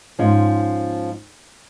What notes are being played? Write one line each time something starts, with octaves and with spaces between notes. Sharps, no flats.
G#2 F3 C#4